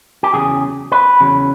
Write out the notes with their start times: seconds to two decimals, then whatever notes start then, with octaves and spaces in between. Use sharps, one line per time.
0.23 G4
0.33 E2 C#3 F#3 G#4
0.92 B4
1.20 E2 C#3 F#3